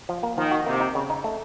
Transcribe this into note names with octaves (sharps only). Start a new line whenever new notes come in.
F3
A#3
D#3 F3
F#4
C3 A#3
D#4
C#3
D#4
A3